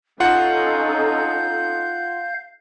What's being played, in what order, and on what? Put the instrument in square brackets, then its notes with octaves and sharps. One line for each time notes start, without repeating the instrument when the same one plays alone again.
[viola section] C#4 D#4 A4 [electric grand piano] F4 F#5 [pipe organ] F5 [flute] G6